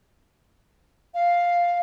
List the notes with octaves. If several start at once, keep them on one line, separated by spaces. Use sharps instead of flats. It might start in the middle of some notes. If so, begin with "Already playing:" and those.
F5